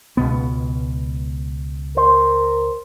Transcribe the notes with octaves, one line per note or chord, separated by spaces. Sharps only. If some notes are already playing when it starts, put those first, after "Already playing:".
C#2 B2 B3
A#4 C5